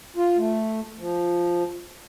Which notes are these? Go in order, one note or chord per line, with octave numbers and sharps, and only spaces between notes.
F4
A3
F3